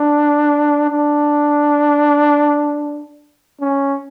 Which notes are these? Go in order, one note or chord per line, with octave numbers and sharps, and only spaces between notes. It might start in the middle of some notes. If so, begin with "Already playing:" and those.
Already playing: D4
D4
C#4